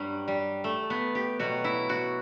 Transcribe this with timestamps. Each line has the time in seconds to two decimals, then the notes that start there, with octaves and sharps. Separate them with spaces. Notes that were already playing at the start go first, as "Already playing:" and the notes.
Already playing: G2 F#3 G3
0.28 G3
0.64 A3
0.90 B3
1.15 G4
1.39 B2 F#3 F#4
1.64 E4
1.89 F#4